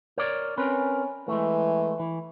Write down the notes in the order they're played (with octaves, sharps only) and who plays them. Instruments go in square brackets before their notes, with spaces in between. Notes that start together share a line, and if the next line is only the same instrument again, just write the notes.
[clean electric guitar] A#4 C#5 D5
[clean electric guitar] C4 A#4 B4 [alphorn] C#4
[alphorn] E3 [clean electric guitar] G#3 A3
[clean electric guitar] E3